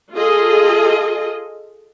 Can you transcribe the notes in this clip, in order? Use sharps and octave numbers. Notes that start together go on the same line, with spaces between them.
F4 G#4 A4 D#5